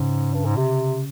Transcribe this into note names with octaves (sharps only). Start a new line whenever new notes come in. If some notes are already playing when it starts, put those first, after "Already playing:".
Already playing: G#2 C#3
G2
G#2
C3